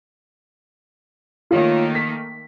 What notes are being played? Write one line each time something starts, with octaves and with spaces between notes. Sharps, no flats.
D#3 A3 A#3 F4 C#5
B6